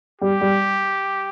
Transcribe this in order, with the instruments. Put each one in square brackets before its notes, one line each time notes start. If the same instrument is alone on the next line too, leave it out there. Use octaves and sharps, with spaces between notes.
[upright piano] G3 [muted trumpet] G4
[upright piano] G3